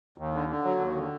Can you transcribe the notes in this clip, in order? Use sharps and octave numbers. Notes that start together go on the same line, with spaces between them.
D#2
D3
D3
F#3
D#2
D3